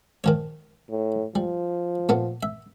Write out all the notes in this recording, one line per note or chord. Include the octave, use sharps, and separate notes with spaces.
D#3 F3 C#5
A2
F3 G3
A#2 A3 B3
E5